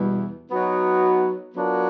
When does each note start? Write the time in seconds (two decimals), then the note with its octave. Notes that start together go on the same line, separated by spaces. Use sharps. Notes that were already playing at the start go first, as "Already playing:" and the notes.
Already playing: E2 B2 G3
0.49 F#3 B3 D#4 F#4
1.54 F#3 B3 D4 F4 A#4